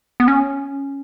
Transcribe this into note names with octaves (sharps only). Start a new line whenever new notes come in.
B3
C#4